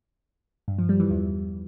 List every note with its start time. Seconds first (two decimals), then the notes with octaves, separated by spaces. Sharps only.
0.68 G2
0.78 F3
0.89 G3
1.00 E3
1.10 E2